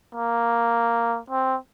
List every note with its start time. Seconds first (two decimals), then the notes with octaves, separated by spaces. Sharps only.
0.15 A#3
1.30 C4